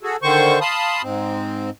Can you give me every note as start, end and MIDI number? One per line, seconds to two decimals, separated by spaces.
0.03 0.16 66
0.03 0.16 68
0.03 0.16 69
0.22 0.59 50
0.22 0.59 51
0.22 0.59 72
0.22 0.59 85
0.61 1.02 77
0.61 1.02 81
0.61 1.02 83
0.61 1.02 84
0.61 1.02 87
1.03 1.70 44
1.03 1.70 60